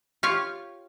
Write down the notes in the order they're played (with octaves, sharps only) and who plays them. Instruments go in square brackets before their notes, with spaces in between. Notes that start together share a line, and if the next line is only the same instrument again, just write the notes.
[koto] F4 G4 C#5 F5